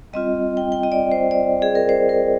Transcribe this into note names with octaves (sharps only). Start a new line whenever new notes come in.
G3 C4 F4 D#5
G5
G5
D#5
D5
C5
D5
G#4
A#4
C5
A#4